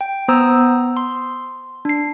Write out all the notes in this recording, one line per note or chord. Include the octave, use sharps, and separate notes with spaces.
G5
B3 C5 A#5 D#6 E6
C6
D4 C7